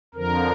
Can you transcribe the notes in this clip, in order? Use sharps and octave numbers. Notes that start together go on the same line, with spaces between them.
F2 D3 F3 A#4